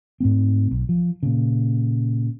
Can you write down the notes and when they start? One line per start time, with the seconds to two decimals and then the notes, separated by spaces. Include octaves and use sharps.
0.20 G#2 A3 C4
0.71 B1
0.89 F3
1.23 A#2 C#3